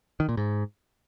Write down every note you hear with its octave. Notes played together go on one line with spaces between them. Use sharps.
D#3
A#2
G#2